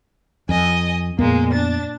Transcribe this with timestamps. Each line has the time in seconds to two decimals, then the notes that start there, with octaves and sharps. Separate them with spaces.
0.49 F2 D#5 G#5
1.19 F2 A#2 G#3 A#3 B3
1.53 D4 A6